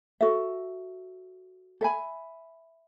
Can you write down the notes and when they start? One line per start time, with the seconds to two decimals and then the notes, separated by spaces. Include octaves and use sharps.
0.21 F#4 A4 E5
1.81 A4 E5 G#5 B5